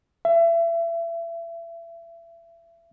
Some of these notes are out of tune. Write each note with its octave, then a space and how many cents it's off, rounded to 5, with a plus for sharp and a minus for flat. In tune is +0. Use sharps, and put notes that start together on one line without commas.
E5 +30